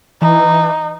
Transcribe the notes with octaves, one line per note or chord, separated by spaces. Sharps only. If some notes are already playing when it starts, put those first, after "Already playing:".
E3 D#4